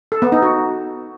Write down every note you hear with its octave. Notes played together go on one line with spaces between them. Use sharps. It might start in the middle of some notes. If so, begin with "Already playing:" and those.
A4
B3
D#4
F#4